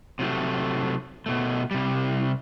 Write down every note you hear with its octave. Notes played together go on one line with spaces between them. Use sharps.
C3 F#3 A3
B2 A3
C3 G3